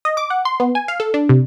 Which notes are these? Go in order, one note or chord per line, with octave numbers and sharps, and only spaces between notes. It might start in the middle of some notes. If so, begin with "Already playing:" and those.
D#5
D6
F#5
C6
B3
G#5
F5
A4
D4
C3